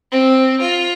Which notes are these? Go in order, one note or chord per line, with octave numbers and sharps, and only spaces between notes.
C4
F4